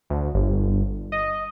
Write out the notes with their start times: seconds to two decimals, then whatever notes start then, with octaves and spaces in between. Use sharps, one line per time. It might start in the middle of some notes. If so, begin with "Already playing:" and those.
0.10 D2
0.34 G1
1.12 D#5